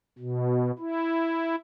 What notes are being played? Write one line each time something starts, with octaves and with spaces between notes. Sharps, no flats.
B2
E4